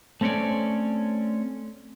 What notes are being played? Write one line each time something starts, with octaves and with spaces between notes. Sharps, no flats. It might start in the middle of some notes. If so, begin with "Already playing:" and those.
A3 C4 C#4 C#5 D5